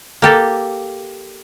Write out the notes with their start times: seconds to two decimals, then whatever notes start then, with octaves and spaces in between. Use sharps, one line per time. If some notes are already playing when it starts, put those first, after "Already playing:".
0.22 A#3 G4 A4